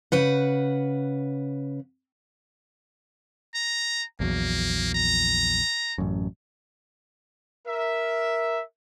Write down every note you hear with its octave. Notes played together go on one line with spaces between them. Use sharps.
C#3 B4 F#5
A#5
A#1 E2 F#3 A#3
A#5
A1 F#2
A#4 E5